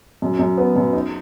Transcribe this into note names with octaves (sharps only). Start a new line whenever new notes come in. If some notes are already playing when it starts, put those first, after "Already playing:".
F#2
F#2
B3
F#2
D#4